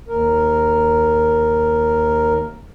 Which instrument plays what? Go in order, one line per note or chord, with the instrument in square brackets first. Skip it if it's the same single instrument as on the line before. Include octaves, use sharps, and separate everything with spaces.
[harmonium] D#2 A#4